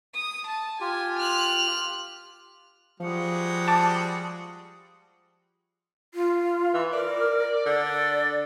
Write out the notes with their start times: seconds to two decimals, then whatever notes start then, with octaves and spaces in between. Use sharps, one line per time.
0.14 D#6
0.48 A5
0.81 F4 G4 G#5
1.20 F6 F#6
3.00 F3 G3 G#3 F#4
3.68 A5 D6
6.14 F4
6.74 E3
6.93 A#4 D5
7.66 D3 D5